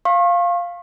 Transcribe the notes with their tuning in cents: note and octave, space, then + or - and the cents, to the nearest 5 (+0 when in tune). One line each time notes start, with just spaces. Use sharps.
F5 +0 C#6 -40